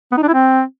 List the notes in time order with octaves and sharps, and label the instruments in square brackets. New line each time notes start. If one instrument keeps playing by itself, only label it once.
[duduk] B3
D#4
D4
E4
C4